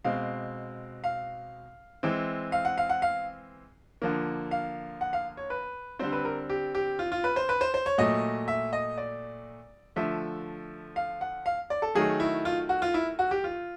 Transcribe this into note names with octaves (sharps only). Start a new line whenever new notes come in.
B2 G#3 C4 F5
F5
E3 G#3 C4
F5
F#5
F5
F#5
F5
D3 F3 A#3
F5
F#5
F5
C#5
B4
D3 G3 C4 C5
B4
A#4
G4
G4
F4
F4
B4
C5
B4
C5
C5
C#5
A#2 F#3 A3 D#5
E5
D#5
D5
D3 F3 A3 E5
F5
F#5
F5
D5
A4
D#3 F#3 A3 G#4
E4
F4
F#4
F4
E4
F#4
G4
F4